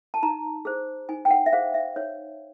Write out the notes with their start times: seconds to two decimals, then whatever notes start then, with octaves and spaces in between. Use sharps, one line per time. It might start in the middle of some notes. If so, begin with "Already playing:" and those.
0.14 A5
0.23 D#4 A#5
0.65 G#4 C5
1.09 D#4 G#5
1.25 G5
1.31 F#5
1.46 E5
1.53 G#4 C5 F5
1.74 E5
1.96 D#4 C#5